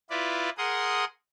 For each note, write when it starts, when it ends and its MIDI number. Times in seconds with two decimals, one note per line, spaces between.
0.10 0.50 64
0.10 0.50 65
0.10 0.50 71
0.10 0.50 74
0.58 1.05 68
0.58 1.05 70
0.58 1.05 78
0.58 1.05 84
0.58 1.05 87